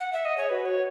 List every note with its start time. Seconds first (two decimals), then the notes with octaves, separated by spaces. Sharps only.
0.00 F#5
0.13 E5
0.25 D#5
0.37 G#4 C#5
0.49 F#4 B4
0.66 C#5